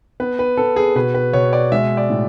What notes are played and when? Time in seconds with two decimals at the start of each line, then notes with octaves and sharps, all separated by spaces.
0.20 B3 B4
0.39 B4
0.57 B3 A4
0.76 G#4
0.95 B2 B4
1.14 B4
1.33 B2 C#5
1.53 D5
1.72 G#3 E5
1.97 D5
2.10 A2